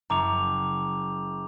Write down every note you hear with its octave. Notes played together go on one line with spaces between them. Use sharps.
F#1 A#5 D6 F7